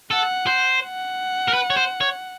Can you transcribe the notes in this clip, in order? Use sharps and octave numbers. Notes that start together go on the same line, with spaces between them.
A4 F#5
C5
F#5
A#4
B4
C#5
C5
C#5